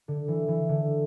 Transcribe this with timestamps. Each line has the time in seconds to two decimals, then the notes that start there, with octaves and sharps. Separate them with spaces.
0.08 D3
0.28 E3
0.48 E3
0.69 D3